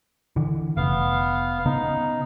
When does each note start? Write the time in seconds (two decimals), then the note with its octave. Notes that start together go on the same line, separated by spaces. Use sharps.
0.36 D3 E3
0.77 F1 B3 F5
1.65 C#3 B3 D#4